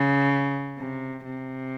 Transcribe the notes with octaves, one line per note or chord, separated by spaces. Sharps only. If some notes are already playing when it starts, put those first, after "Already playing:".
Already playing: C#3
C3
C3